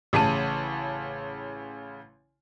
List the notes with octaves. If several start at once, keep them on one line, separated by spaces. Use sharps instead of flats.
A1 C#3 A5 D#7